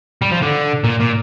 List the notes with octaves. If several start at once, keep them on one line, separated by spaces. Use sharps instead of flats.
G3
F3
D3
A#2
A#2